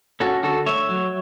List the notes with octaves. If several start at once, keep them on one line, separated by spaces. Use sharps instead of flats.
C#4 F#4 A4
D3 F#4 A4
A3 C#5 E5
F#3